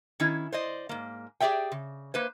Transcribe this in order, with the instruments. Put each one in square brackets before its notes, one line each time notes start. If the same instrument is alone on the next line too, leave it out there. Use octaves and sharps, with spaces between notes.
[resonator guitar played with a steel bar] D#3 C#4 E4
C5 D5 D#5
G#2 A#3
G4 G#4 D5 E5 G5
C#3
A#3 B4 C5